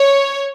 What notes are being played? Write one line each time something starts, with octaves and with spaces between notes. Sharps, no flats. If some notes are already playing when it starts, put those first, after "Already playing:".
Already playing: C#5